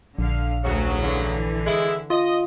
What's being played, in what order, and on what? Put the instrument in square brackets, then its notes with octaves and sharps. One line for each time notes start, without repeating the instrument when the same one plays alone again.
[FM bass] A#1 [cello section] D3 F5
[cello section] D2 F#4 [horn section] C#3 F#3
[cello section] D3 E3
[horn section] G#3 E4
[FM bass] F4 [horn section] D#5